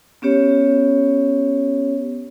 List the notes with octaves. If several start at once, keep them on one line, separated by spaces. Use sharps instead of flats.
B3 C#4 G4 C#5